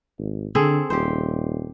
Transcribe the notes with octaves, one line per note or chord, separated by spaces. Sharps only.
G#1
D3 C4 G#4 A4
D#1 G4 C5